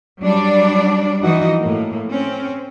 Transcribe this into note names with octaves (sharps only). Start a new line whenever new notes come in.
F#3 G3 D4 D5
E3 F3 D#4 F#4 D#5
A2 A#3
C4 C#4